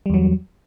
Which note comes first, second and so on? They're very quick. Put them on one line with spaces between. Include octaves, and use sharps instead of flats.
G3 E2 F#3